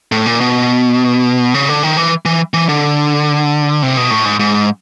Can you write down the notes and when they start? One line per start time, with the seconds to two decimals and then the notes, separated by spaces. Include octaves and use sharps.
0.12 A2
0.26 A#2
0.40 B2
1.54 C#3
1.69 D3
1.83 D#3
1.97 E3
2.25 E3
2.54 E3
2.69 D3
3.83 C3
3.97 B2
4.11 A2
4.25 G#2
4.40 G#2